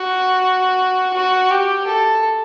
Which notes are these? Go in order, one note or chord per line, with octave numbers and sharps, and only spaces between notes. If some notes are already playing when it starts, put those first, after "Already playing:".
Already playing: F#4
F#4
G4
A4